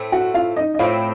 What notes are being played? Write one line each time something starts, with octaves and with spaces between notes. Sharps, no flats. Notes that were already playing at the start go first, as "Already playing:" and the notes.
Already playing: A2 A3 C4
F#4 F#5
F4 F5
D#4 D#5
D#5
A2 A3 C4 F4 F5